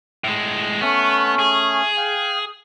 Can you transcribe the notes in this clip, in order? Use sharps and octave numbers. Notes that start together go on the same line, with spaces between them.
A2 G#3
A3 B3 C#4
G#4
F5 G5